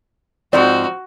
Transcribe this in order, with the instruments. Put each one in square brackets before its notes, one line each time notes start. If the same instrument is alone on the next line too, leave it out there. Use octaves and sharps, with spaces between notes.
[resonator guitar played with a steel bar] G#2 F3 C4 [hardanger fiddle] F#4 [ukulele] D5